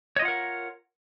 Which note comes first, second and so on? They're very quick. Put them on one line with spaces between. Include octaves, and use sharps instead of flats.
C#5 D#5 F4 F#5 A#4